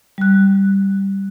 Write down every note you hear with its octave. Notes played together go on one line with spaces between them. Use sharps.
G3 F#6